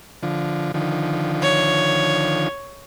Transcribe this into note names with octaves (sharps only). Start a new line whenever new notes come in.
D3 F3
D3 D#3 F3
C#5